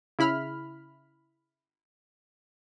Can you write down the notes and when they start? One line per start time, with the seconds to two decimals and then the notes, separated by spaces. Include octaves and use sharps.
0.19 C#3 E4 B5 F6